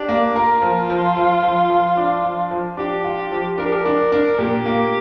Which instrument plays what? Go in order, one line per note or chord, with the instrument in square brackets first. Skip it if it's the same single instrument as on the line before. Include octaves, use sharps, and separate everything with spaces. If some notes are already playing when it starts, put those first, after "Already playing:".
Already playing: [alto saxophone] D4 [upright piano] G4
[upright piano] A#3
[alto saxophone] F4 [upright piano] A#4
[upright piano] F3
F3
F3
F3
F3
D4
F3
F3
[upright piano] D4 [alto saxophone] G4
[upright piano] F4
F3
[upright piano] D4 [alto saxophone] A#4
[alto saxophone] G4
A#4
[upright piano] D4
D4
[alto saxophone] A#4
[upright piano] A#2 [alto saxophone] G4
[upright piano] A#3